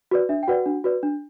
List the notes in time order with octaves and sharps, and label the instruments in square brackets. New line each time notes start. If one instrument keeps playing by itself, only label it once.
[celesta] F#4 B4 D5
D4 E5
G5
F#4 B4 D5 F#5
D4
F#4 B4 D5
D4